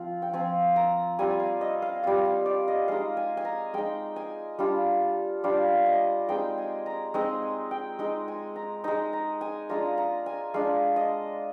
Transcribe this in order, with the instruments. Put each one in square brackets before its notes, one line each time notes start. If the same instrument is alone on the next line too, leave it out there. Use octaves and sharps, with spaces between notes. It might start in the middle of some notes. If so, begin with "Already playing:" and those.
Already playing: [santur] F3 C4 F4
G5
F3 C4 F4 G#5
A#5
G3 C4 F4 G#5
F5
D#5
F5
G3 C4 F4 F5
F5
D5
D#5
G#3 D#4 F5
G#5
G#5
A#5
G#3 D#4 G5
G#5
G3 D4 F4
G3 D4 F4 F5
D#5
G#3 C4 D#4 G5
G#5
A#5
G#3 C4 D#4 A#5
G#5
G5
G#3 D#4
G#5
A#5
G#3 D#4 A#5
A#5
G#5
G#3 D4 F4 A#5
A#5
G#5
G#3 D4 F4 F5
D#5